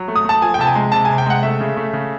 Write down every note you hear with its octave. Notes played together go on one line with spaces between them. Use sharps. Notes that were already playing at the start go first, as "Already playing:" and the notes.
Already playing: F#3
A3
D#6
A3 A5
F3 G#5
G5
C3 A5
G#5
G#3
C3 A5
G#5
C3
G5
G#3 F#5
A3 E5
C#3
A3
C#3